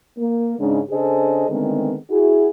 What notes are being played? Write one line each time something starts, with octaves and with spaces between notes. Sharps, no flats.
A#3
G#2 C#3 D4
C#3 D4 G#4 A4 C5 D#5
D3 D#3 G#3 A3 B3 C4
E4 F#4 G#4